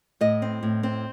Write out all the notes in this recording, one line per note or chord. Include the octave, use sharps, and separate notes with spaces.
A2 D#5
C4
A2
C4